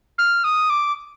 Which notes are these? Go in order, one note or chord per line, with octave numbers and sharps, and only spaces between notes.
F6
D#6
D6